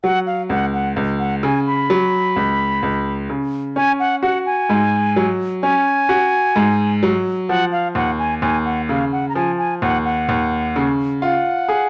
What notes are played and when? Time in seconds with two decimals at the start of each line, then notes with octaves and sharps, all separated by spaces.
0.03 F#3 F#5
0.27 F5
0.49 C#2 F#5
0.74 F#5
0.96 C#2
1.19 F#5
1.43 C#3 G#5
1.66 B5
1.90 F#3
2.36 C#2
2.83 C#2
3.30 C#3
3.76 C#4 G#5
4.00 F#5
4.23 F#4 F#5
4.46 G#5
4.69 G#2
5.16 F#3
5.63 C#4 G#5
6.09 F#4
6.56 G#2
7.03 F#3
7.49 F3 F#5
7.72 F5
7.95 D#2 F#5
8.19 G#5
8.42 D#2 G#5
8.65 F#5
8.89 C#3 F5
9.12 F#5
9.29 A#5
9.35 F3 G#5
9.58 G#5
9.82 D#2 F#5
10.05 F#5
10.29 D#2
10.76 C#3
11.22 F4 F#5
11.68 G#4